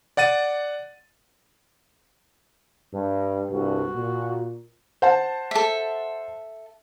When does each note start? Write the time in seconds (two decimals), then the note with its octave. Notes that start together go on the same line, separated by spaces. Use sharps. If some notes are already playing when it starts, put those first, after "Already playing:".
0.17 D5 F#5 A6 D#7
2.94 G2
3.51 C2 G2 F#4
3.96 A#2
5.02 C5 F#5 A5
5.51 A4 E5